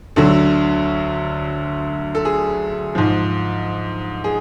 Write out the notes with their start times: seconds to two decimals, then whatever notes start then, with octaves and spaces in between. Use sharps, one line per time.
0.16 D2 D3 F#3 A4
2.15 A4
2.25 G#4
2.95 G#2 F3
4.24 G#4